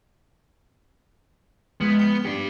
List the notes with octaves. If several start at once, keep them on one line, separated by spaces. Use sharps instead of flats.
F3 G#3 B3
G5 C#7 G7
D4 G4